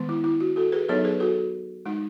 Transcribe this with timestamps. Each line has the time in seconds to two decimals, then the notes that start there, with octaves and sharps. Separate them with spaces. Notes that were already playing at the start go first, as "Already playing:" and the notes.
Already playing: D#3 G#3 B3
0.09 E4
0.24 E4
0.40 F#4
0.56 F#4 A4
0.72 G#4 B4
0.89 F#3 B3 D#4 A4 C#5
1.04 G#4 B4
1.20 F#4 A4
1.86 G#3 D#4